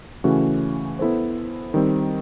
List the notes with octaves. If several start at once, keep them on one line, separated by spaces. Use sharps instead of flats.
C#3 E3 A3 C#4 F#4
B3 E4 A4 C5
D#3 G3 C4